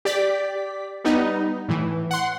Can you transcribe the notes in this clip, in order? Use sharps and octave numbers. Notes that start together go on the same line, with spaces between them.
G4 D5 B6
G3 B3 D#4
A2 E3
F#5 C6